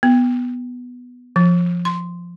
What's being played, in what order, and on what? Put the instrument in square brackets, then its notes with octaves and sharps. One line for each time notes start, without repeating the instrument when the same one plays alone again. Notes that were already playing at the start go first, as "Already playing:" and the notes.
[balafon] B3
F3
C6